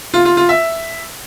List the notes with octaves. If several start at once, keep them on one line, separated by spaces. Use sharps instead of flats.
F4
F4
F4
E5